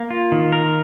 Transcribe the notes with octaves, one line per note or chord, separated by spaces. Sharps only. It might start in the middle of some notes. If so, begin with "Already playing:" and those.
Already playing: A#3
F4
D#3
A#4